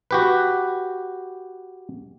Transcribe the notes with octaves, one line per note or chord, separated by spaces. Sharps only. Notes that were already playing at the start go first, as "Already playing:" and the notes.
F#4 G4 B4